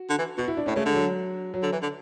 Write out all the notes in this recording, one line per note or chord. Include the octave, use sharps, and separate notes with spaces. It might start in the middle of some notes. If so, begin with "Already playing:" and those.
Already playing: F#4
D3
E3
B2 F#4
E4
D4
A2 C#4
C#3 A3
D3 G#3
F#3
F#3
D3
E3
D3